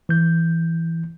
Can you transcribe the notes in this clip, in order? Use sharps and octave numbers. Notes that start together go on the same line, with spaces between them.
E3 G6